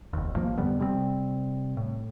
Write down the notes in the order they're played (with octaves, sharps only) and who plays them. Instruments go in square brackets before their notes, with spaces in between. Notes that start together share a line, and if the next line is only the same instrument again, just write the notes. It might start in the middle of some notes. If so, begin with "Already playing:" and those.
[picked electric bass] F1 D#2
A1 G2 F3 A#3
F2 D3 G3 B3
C3 G3 G#3 C4
A2